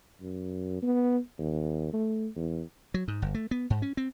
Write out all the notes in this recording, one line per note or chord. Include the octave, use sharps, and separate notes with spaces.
F#2
B3
D#2
A3
E2
F#3
G#2
G1
A3
B3
G#2
C#4
C4